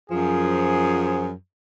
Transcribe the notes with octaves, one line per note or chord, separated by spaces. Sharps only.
F#2 F3 G#4